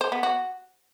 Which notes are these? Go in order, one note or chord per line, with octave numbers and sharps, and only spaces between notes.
C5
B3
F#4